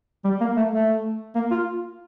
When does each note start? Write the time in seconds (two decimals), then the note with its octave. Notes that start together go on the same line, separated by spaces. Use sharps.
0.24 G3
0.41 A#3
0.57 A3
0.71 A3
1.35 A#3
1.51 F4